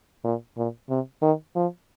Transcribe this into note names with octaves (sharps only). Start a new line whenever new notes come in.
A#2
A#2
C3
D#3
F3